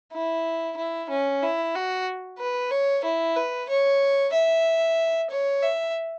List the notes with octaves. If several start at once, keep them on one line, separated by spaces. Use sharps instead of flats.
E4
E4
C#4
E4
F#4
B4
C#5
E4
B4
C#5
E5
C#5
E5